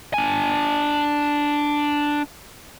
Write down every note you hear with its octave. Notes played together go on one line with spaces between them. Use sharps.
D4 G#5